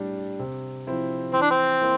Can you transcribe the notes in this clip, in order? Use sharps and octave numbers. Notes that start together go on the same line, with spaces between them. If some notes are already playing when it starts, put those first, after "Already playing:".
Already playing: A2 G3 D4
C3
F3 C4 E4
E3 C4
D4
C4
A#3 E4